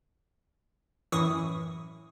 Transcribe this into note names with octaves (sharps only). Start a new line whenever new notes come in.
F#2 A2 E3 C#6 D#6